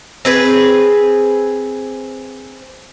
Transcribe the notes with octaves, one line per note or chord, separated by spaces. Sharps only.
C4 G#4 B4